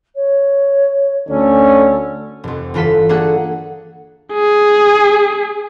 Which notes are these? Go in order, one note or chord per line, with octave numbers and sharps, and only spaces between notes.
C#5
D2 D3 C#4 A4
F1 F2
G1 E3 F4 A4 B6 E7
A#3 D4 F#4 G#4 A4 F#5
G#4